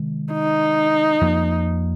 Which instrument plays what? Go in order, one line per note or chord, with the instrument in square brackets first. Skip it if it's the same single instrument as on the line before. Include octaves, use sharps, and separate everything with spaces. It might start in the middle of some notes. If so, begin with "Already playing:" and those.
Already playing: [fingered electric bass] C3 D#3 G#3
[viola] D#4
[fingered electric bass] F2 F3 A#3